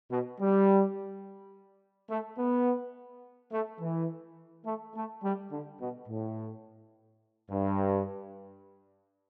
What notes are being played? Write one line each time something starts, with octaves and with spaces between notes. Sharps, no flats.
B2
G3
A3
B3
A3
E3
A3
A3
G3
D3
B2
A2
G2